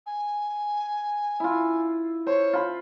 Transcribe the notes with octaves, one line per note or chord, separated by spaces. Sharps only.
G#5
E4 F4
C5 C#5
F4 B5